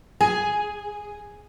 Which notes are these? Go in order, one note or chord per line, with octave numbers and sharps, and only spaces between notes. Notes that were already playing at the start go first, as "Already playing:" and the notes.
G#4 G#5